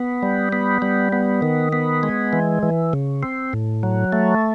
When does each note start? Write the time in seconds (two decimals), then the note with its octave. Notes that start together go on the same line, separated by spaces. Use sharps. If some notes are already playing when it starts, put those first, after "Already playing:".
Already playing: B3
0.23 G3
0.53 B3
0.82 G3
1.12 B3
1.42 D#3
1.73 B3
2.03 G#3
2.33 E3
2.63 E3
2.93 C#3
3.23 C4
3.53 A2
3.83 F#3
4.13 A3